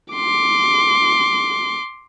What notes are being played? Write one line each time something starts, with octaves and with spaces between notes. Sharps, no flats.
C6 D6